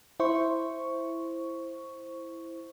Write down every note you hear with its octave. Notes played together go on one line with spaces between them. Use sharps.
E4 C5 C#6